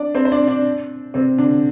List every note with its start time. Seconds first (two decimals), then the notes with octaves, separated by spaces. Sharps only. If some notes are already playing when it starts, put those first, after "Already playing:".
Already playing: D4 D5
0.15 C4 C5
0.25 C5
0.32 D4 D5
0.48 D4 D5
1.14 C3 C4
1.38 D3 D4